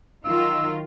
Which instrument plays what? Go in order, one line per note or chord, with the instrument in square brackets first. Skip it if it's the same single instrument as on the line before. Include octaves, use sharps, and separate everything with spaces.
[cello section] D#3 F#3 F4 [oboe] E6